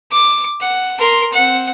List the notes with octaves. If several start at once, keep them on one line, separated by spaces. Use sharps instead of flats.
D6
F#5
A#4 C6
C4 F#5